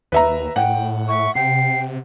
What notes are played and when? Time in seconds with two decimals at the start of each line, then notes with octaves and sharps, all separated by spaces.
0.12 D#2 B4 E5 A#5
0.56 A2 F#5 G5
1.08 E5 C#6
1.35 C3 G5 C7